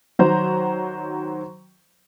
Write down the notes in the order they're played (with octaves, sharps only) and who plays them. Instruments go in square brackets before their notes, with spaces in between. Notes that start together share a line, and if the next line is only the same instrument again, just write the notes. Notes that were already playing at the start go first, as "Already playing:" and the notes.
[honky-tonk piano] D#3 F#3 C5 A#5